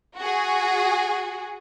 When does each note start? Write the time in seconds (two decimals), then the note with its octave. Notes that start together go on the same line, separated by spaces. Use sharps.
0.17 F#4 G#4